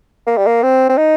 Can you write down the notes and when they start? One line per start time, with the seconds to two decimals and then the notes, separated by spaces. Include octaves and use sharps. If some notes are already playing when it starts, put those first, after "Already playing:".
0.27 A#3
0.38 G3
0.46 A#3
0.63 C4
0.89 C4
0.98 D#4